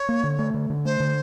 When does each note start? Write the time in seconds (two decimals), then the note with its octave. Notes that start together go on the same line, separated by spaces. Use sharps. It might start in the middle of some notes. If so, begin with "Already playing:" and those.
Already playing: C#5
0.09 A#3
0.23 D3
0.39 A3
0.54 D3
0.70 D3
0.85 A3 C5
1.00 D3